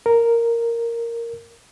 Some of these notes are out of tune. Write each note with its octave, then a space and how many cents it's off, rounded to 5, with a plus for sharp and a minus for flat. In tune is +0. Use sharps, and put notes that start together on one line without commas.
A#4 -5